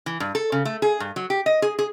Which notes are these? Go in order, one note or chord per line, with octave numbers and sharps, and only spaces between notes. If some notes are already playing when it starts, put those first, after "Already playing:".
E3
G2
A4
C#3
A3
G#4
G2
F#3
G4
D#5
G#4
G#4